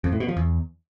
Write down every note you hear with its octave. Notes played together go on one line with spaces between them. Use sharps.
F2
A2
B2
F3
E2